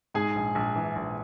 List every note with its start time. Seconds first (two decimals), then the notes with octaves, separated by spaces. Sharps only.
0.14 G#2 G#4 G#5
0.35 A#1
0.55 A#1
0.76 E3
0.96 A#1